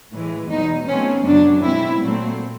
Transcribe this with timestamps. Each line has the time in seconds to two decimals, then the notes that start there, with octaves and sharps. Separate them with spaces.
0.12 A2 E3 G#3
0.49 E2 B2 F#3 D#4
0.87 B2 F#3 A3 C4 C#4
1.24 F#2 C#3 F#3 D4
1.62 B2 G#3 C4 E4
2.00 A#2 F#3 A3 C4